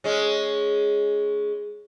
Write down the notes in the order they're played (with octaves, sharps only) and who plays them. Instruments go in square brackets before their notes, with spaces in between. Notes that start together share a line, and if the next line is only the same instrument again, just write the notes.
[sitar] G#3 C#4